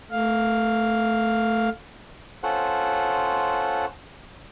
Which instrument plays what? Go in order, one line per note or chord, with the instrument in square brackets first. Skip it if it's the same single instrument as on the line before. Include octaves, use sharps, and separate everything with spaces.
[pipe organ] A3 F5
[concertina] C#4 F4 A4 C5 F#5